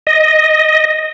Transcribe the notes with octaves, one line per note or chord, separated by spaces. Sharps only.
D#5